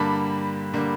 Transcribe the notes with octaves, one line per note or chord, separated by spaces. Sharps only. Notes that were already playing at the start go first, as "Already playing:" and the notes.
Already playing: G2 D3 G3 A#3 A5 B5
D3 G3 A#3